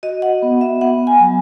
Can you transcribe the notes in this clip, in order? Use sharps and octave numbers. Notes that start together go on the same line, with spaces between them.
F#4 D#5
F#5
B3
E5
B3 F#5
G#5
F#3